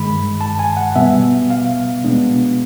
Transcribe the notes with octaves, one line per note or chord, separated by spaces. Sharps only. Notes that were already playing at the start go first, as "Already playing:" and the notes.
Already playing: G2 D#3 G#3 B5
A5
G#5
F#5
B2 G3 B3 E5
F5
B2 G#3 B3 D4